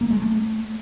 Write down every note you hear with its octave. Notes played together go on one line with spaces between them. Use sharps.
A#3
G#3
A3